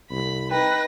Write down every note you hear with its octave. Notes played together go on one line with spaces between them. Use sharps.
C2 B5
D#4 B4 G5 A#6